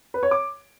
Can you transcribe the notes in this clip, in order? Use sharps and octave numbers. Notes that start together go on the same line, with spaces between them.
B4
C#5
D6